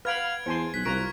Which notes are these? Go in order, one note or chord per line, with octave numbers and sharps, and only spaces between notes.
B4 F5 F#5 B5 F6 G#6 D7
E2 C5 G#5 A5 C6
B1 F#6 B6
C2 F4 A#4 A#5 C#6 B6 D7